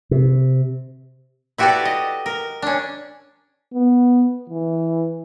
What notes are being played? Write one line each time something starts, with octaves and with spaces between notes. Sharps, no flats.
C3
E4 F#4 G4 A4 B4 D5
D#5
A#4
C#4 D4
B3
E3